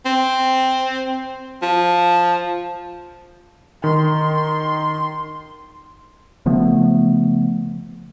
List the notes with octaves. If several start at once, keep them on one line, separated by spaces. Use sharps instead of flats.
C4
F3
D#3 C6
C#3 F3 A3 B3